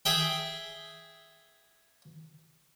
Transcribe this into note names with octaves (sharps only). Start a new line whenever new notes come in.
G#4 E5 G5